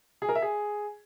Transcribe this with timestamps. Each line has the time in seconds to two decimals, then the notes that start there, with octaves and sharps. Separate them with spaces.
0.22 G#4
0.29 A#4
0.35 E5
0.42 G#4